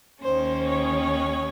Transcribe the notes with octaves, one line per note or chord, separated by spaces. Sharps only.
D#2 D#3 A#3 C#4 C5
C#5